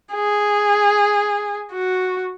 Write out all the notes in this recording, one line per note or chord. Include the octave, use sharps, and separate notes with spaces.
G#4
F#4